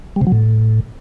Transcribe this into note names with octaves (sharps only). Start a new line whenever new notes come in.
G3
C3
F#3
A2